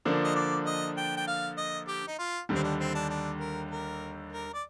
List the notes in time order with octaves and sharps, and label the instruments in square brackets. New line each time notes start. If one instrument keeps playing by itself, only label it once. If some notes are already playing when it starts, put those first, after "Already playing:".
[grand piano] D3 F3 A#3 D4
[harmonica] D#5
D5
D#5
G5
G5
F5
D#5
G4
D#4
F4
[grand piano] D#2 D3 G3
[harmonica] C4
D4
C4
D4
D4
A#4
A#4
A#4
D5